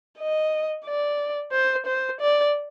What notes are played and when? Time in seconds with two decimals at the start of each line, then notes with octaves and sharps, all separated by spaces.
0.19 D#5
0.86 D5
1.53 C5
1.86 C5
2.21 D5